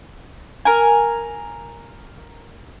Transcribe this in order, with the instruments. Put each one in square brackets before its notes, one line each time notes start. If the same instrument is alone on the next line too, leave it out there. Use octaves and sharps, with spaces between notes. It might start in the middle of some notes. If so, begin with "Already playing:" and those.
[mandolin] A#4 G#5